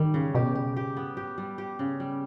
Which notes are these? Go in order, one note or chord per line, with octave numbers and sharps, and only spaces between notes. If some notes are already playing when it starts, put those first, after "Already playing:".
Already playing: D#3 G3
C#3
B2 G4
G4
G4
B3
G4
G3
G4
C#3
G3